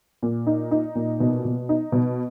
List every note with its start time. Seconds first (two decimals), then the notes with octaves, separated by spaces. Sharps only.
0.23 A#2
0.47 D#4
0.71 D#4
0.95 A#2
1.20 B2
1.45 B2
1.69 D#4
1.92 B2